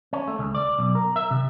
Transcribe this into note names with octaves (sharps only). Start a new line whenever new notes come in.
C#4
A3
C#2
D5
B1
A#4
E5
C3